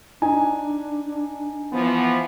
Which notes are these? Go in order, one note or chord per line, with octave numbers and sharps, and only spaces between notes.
D4 D#4 G#5
E3 F3 B3